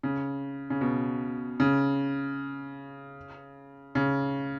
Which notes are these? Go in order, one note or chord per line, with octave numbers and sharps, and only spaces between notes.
C#3
C#3
B2
C#3
C#3